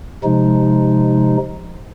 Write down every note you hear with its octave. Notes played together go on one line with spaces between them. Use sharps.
C3 F3 G#3 D#4